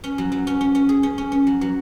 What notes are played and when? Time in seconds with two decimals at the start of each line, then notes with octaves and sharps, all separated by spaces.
0.04 C#4
0.18 F#3
0.32 F#3
0.47 C#4
0.61 C#4
0.75 C#4
0.89 G#4
1.03 C#4
1.18 C#4
1.32 C#4
1.47 F#3
1.61 F#3